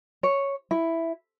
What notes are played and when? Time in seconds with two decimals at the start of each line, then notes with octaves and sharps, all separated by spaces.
0.23 C#5
0.71 E4